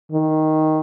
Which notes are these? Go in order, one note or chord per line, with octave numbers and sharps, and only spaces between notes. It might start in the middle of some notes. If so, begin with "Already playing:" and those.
D#3